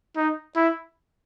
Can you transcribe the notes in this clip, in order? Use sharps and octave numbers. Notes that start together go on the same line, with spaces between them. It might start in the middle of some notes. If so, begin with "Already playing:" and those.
D#4
E4